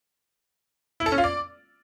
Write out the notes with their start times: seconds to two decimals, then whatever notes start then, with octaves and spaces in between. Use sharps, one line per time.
1.00 E4
1.06 A4
1.12 C#4
1.18 F4
1.24 D5